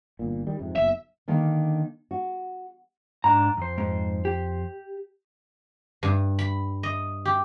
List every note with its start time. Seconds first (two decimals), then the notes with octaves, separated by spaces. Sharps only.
0.19 G1 A#2
0.47 D#3 G3
0.59 F2 G#2 C3
0.76 F#1 B1 E5
1.28 D3 D#3 A#3
2.11 F#4
3.24 G#2 D4 A#5
3.57 F2 C5
3.78 G#2
4.25 G4
6.03 G2
6.39 B5
6.83 D#5
7.25 G4